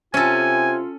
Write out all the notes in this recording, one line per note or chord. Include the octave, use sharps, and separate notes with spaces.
C3 C#4 F4 A4 G#5